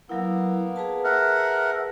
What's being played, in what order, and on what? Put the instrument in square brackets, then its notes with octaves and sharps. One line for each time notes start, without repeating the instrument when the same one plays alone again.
[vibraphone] F#3 E4 [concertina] A#3 B3
[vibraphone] G#4 B4 A5
[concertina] A#4 E5 F#5